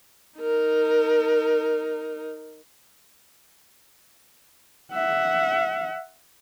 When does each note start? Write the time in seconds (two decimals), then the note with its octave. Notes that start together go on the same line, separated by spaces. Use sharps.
0.39 D#4 A#4
4.93 E5 F#5